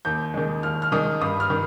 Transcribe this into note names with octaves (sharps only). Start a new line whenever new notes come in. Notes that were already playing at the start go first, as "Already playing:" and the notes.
D#2 G6
D#3 G#3
D#2 F6
F6
D#3 G#3 D#6
G2 D#6
F6
D#3